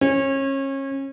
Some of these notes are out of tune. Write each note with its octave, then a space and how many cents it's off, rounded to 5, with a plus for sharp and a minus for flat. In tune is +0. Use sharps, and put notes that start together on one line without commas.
C#4 -30